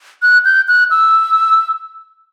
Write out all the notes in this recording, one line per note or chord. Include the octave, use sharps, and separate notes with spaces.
F#6
G6
F#6
E6